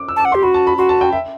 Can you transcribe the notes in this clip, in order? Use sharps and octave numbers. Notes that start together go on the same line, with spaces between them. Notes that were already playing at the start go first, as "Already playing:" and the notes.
Already playing: D6
E6
A5
D6
F#5
C6
G4
F#4 B5
A5
B5
F#4 C6
A5
G5
E5